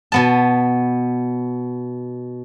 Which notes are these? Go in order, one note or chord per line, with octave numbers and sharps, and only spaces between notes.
B2 B3 A5